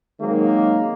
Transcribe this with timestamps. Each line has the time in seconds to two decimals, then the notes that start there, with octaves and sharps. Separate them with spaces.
0.20 D#3 F#3 G#3 A#3 C4 D#4